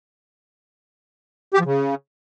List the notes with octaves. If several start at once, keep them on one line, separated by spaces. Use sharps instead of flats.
G4
F3
C#3